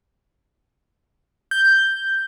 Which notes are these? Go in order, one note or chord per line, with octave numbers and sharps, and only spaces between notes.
G6